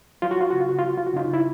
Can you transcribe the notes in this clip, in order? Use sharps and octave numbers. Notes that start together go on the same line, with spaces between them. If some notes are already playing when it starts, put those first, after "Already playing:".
F#3 F4
F#4
F4
C#3 F#4
F4
F#4
F#3 F4
F#4
F4
F#4
C#3 D#4 F4
E4